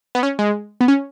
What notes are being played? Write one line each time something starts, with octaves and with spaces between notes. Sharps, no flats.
B3
C#4
G#3
B3
C#4